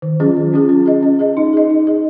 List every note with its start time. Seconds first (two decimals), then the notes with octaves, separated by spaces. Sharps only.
0.02 D#3
0.20 F#3 C#4 F4 G#4
0.37 D#3
0.52 F#3 C#4 F4 G#4
0.69 C#4
0.86 G#4 D#5
1.03 C#4
1.19 G#4 D#5
1.37 D#4
1.53 G#4 D#5
1.70 D#4
1.87 G#4 D#5